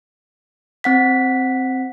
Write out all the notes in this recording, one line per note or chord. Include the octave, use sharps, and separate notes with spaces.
C4 F#5 B6